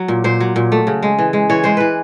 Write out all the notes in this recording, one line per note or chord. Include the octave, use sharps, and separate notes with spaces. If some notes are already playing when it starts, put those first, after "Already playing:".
Already playing: F#3
A#2
A#2 C5
F#3
A#2
A3
C#3
G#3
E3
G#3
E3 C#5
G#3 C5
E3 B4